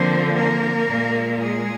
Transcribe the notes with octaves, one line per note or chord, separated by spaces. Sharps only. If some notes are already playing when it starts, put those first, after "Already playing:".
Already playing: D3 F3 A#3 C4 C5
A#3 A#4
A#2 G#3
G#3 G#4